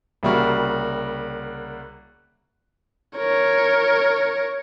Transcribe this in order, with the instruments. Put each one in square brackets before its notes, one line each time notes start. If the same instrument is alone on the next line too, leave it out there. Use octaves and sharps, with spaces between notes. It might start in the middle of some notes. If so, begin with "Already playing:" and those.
[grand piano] C2 C#3 G3 A#3 F#4 C#6
[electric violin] A#4 C#5